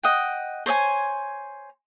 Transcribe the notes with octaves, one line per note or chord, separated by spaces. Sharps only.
D#5 F#5 G5
C5 C#5 D#5 G#5